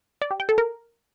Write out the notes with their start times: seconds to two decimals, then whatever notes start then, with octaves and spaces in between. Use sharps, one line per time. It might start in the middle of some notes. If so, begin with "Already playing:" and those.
0.22 D5
0.31 G4
0.40 G5
0.49 A4
0.58 A#4